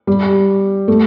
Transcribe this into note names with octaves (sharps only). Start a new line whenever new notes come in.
G3
A3